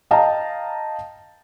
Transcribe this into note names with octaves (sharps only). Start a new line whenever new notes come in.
D#5 F5 G5 A5 A#5